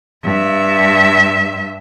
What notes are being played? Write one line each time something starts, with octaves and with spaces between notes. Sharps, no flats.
G2 E5